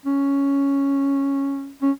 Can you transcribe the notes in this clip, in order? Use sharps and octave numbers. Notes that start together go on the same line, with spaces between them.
C#4
C#4